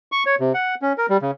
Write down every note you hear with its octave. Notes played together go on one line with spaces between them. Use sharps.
C#6
C#5
C3
F#5
C#4
A#4
G3
C#3